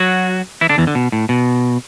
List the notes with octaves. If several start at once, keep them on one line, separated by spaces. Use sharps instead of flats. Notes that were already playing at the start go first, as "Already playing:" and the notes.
Already playing: F#3 F#4
E3 E4
D3 D4
E2 E3
D3
B2
A2
B2